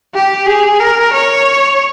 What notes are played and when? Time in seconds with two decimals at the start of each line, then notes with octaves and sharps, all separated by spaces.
0.14 G4
0.46 G#4
0.80 A#4
1.13 C#5